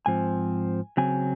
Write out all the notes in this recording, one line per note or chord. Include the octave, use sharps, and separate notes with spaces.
G#2 F3 C4 G#5
C#3 F#3 C4 G#5